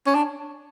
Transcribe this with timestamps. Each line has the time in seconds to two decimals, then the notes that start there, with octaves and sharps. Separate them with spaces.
0.07 C#4
0.15 D4